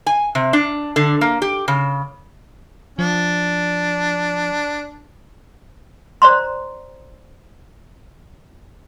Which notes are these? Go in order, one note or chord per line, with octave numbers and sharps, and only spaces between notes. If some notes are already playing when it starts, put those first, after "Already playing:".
G#5
C3
D4
D3
A#3
G4
C#3
F3 D4
C5 D5 A#5 C6